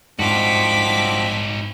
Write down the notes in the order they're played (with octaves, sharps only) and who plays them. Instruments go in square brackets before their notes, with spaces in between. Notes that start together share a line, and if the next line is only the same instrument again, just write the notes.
[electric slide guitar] G#2 [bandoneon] F3 C4 D4 [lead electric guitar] D#4 F#4 [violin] D6 B6